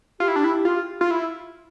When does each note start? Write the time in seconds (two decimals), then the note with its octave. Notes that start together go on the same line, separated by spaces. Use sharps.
0.20 F4 G4
0.28 E4
0.36 D4
0.44 E4
0.65 F4
1.01 F4
1.11 E4